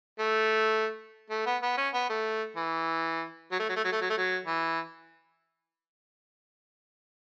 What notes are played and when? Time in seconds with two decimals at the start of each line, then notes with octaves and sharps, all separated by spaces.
0.19 A3
1.30 A3
1.46 B3
1.62 B3
1.77 C#4
1.94 B3
2.09 A3
2.56 E3
3.52 F#3
3.59 A3
3.69 F#3
3.76 A3
3.84 F#3
3.92 A3
4.01 F#3
4.10 A3
4.18 F#3
4.46 E3